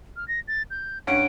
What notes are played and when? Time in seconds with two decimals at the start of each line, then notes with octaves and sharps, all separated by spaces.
0.16 F6
0.28 A#6
0.48 A6
0.70 G6
1.07 G2 C#4 F#5 D7